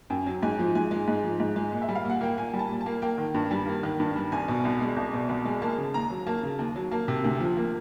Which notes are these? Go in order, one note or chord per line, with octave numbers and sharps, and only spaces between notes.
F#2 G5
F#3
G#2 G#5
F3
G#2 G#5
G#3
G#2
F3
G#2
G#3
A#2
E5
G3
F5
A#2 F#5
A#3 G5
A#2 G#5
G3
A5
A#2
A5
A#3
A#3 G5
D#3
G2
G3
A#3
D#3
G2
G3
C2 G#5
B2
C2
G#3
C2
B2
C2
G#3
A#3 A5
C#3
D#2 A#5
F#3
A#3 A5
C#3
D#2
F#3
A#3 A5
C3
D2
F3
A#3